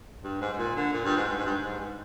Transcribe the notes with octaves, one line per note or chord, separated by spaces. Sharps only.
G2
G#2
G#2
A#2
D3
A#2
G2
G#2
G2
G#2
G2
G#2